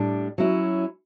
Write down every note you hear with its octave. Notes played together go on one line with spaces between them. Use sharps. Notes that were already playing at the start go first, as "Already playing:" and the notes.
Already playing: A2 G3 D4
F#3 C#4 E4